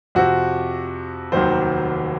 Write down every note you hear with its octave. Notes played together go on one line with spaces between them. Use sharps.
F2 C3 F3 F#4
F1 D#2 D#3 F#3 C5